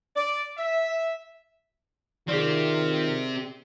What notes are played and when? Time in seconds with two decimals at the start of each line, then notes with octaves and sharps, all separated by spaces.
0.15 D5
0.57 E5
2.29 D#3 C4 F4 G4 G#4 D5